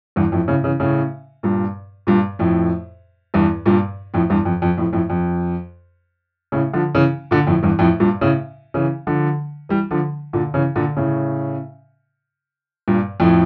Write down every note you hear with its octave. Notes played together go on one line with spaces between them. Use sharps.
E2 G2
F2 A2
A2 C#3
C#3 E3
A2 C#3
G2 A#2
G2 A#2
F2 A2
E2 G2
G2 A#2
F2 A2
E2 G2
F2
F2
F2 A2
F2 A2
F2
A2 C#3
D3 F3
C#3 E3
A#2 D3
F2 A2
E2 G2
F2 A2
G2 A#2
A2 C#3
C#3 E3
D3 F3
E3 G3
D3 F3
A#2 D3
C#3 E3
A#2 D3
A2 C#3
G2 A#2
F2 A2